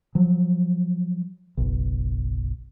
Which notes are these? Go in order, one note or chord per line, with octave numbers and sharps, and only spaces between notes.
F3 F#3
F#1 B1